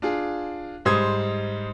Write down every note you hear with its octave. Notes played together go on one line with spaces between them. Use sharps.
D4 F4 G#4
G#2 G3 C5 D#6 G#6